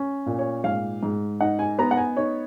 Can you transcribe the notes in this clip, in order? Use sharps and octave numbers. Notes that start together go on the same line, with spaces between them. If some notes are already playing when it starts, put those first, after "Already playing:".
Already playing: C#4
A#2
C#5
G#2 F5
G#2
D#4 F#5
G#5
B3 A#5
F#5
G#5
D#4 C#5